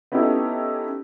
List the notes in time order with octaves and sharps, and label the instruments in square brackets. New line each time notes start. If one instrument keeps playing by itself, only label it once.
[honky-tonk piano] B3 C#4 D#4 E4 G4 A4